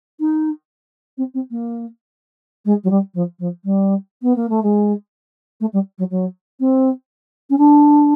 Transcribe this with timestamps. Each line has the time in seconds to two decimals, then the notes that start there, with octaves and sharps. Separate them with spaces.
0.20 D#4
1.17 C4
1.34 C4
1.50 A#3
2.65 G#3
2.83 F#3
2.90 G3
3.14 F3
3.39 F3
3.64 G3
4.22 B3
4.35 A#3
4.49 A3
4.62 G#3
5.60 A3
5.73 G3
5.98 F#3
6.10 F#3
6.59 C4
7.49 C#4
7.58 D4